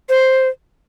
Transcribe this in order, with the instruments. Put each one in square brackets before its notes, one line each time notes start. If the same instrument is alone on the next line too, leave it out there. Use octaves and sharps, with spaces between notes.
[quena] C5